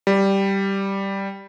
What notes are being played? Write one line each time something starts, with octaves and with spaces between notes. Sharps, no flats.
G3